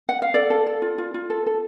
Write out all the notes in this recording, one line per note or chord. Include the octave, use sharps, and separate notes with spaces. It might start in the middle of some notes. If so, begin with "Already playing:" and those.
F#5
F5
A4 D5
A4
A4
F4
F4
F4
A4
A4